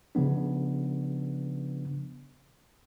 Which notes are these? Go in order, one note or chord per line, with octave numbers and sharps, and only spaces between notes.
C#3 F3 B3 D4